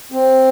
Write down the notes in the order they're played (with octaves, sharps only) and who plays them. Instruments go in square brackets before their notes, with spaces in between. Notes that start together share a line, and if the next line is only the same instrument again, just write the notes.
[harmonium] C4